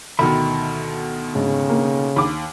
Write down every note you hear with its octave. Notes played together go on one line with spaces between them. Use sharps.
D2 B2 D#3 E5 B5
G#2 C#3
A#3
D#2 B5 D6